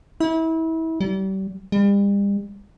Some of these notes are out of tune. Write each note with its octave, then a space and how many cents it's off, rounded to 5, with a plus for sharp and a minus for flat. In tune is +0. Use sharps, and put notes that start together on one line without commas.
E4 -30
G3 -35
G3 +40